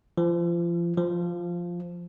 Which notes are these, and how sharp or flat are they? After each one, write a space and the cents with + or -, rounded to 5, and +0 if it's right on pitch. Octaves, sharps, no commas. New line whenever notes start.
F3 -30
F3 +0